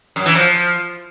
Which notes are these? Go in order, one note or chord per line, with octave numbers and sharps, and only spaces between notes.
F#2
E3
F3